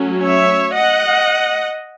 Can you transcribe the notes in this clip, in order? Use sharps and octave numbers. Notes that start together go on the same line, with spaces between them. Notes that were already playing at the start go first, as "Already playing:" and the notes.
Already playing: F#3 A3 C#4
C#5 E5
D#5 F#5